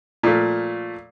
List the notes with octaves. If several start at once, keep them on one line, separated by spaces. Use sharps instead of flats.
A#2 F3 A3